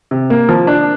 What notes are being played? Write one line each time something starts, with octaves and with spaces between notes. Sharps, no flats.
C3
A#3
F3
D4